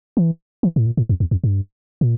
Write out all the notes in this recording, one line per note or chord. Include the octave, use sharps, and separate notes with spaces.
E3
E3
A2
A#2
A2
F2
E2
F2
G2
A#2